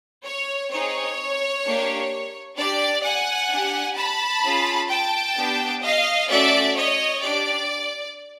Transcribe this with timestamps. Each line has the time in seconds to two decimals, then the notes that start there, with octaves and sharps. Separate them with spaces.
0.26 C#5
0.71 C4 D#4 G#4 C#5
1.65 A#3 D4 G4
2.58 D4 G4 D5
3.04 F#5 G#5
3.51 D4 G4
3.97 A5 B5
4.44 C#4 F4 G#4
4.90 G5 A5
5.37 B3 D4 G4
5.83 D#5 F5
6.29 A3 C#4 F#4 A4 D5 E5
6.76 C#5 D#5
7.23 D4 G4 D5